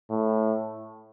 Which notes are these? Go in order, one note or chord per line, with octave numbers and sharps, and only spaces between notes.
A2